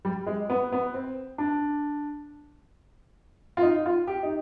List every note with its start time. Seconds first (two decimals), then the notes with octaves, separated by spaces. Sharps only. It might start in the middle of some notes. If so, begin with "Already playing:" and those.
0.05 G3
0.27 G#3
0.50 B3
0.72 B3
0.94 C4
1.38 D4
3.57 F4
3.62 D#4
3.86 F4
4.07 G4
4.23 D#4